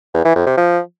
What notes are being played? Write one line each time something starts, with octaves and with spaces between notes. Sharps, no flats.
E2
E3
F2
C3
F3